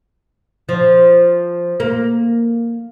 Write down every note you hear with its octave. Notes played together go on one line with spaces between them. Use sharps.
F3
A#3